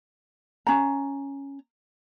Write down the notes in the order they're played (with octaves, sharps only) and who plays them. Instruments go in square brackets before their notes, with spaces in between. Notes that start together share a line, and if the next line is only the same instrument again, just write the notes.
[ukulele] C#4 A#5